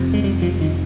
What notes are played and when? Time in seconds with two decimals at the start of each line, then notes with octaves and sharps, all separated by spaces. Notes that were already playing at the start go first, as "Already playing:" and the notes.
Already playing: F1 F2 C3
0.14 G#3
0.24 G3
0.42 F3
0.61 D#3